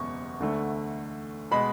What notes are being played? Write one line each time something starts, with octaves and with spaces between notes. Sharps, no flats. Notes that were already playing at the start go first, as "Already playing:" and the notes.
Already playing: F#1 E2 B2 C#6
D2 D3 A3
B2 G#3 B5